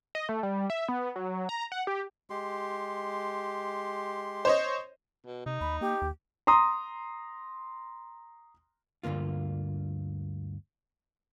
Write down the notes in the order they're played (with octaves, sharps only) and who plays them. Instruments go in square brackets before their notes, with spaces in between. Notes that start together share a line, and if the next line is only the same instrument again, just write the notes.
[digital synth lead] D#5
A3
G3
E5
B3
F#3
A#5
F#5
G4
[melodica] G#3 G4 C6
[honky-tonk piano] C5 C#5 D#5
[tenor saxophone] B2
[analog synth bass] C3 [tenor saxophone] D#4
[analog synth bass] D#2 [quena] B5
[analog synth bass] A#3 [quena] G4
[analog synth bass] D#2
[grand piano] A#5 C6 D#6
[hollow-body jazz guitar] D2 G2 D3 A#3 F4